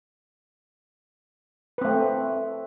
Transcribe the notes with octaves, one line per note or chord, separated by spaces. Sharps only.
A3 C4 B4